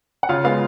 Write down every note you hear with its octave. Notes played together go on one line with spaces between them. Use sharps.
F#5
C#3 F4 F5
G#3 B3 F4 F5